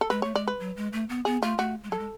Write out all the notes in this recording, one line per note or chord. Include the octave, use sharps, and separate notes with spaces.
A4
G#3 B4
A3 C#5
G#3 D5
B4
F#3
G#3
A3
B3
B3 G#4
A3 F4
A3 F#4
G#3
F#3 A4
G#3